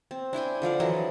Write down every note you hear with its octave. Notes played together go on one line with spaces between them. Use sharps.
C4
D4 E4 G5 G#5
D3 F3 D5 F5
E3 F#3 A4 D#5